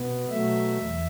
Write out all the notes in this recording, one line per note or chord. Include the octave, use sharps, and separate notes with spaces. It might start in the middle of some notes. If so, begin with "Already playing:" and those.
Already playing: B2 B3
B2 F#3 A3 E5
E2